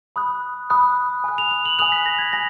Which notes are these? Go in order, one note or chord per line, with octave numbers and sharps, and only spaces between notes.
B5 D#6 F#6
B5 D#6 F#6
G#5 D#6 F#6
F7
F7
F#7
G#5 D#6 F#6 F7
B6
A#6
G#6
G#5 A#6